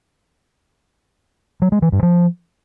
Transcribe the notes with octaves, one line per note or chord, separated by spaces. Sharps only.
F#3
G#3
E3
G2
F3